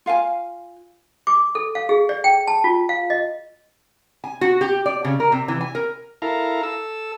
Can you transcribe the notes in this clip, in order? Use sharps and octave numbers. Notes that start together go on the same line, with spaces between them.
F4 F5 G5 G#5
D6
A4
F5
G#4
D5
G5
A5
F4
F5
D#5
G#5
F#4
G4
D5
C#3
A#4
C3
E3
G#5
A#4
E4 A4 A#4 F5 A#5
A4 E6